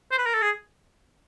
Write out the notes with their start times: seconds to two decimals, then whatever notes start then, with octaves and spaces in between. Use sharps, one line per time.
0.11 C5
0.18 B4
0.26 A#4
0.34 A4
0.42 G#4